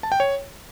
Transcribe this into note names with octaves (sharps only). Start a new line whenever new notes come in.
A5
G5
C#5